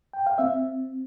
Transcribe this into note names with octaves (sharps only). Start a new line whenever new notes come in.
G5
F5
C4 E5